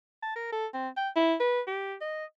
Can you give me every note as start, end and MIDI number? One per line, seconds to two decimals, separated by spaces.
0.23 0.35 81
0.36 0.49 70
0.52 0.66 69
0.74 0.88 60
0.97 1.09 79
1.16 1.35 64
1.40 1.61 71
1.67 1.95 67
2.01 2.25 75